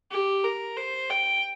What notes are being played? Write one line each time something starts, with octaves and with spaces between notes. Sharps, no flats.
G4
A#4
C5
G5